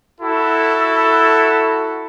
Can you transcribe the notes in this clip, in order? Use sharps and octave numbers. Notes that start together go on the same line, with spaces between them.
E4 F#4 A4